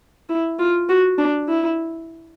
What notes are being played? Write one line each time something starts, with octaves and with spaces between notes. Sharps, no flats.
E4
F4
F#4
D4
E4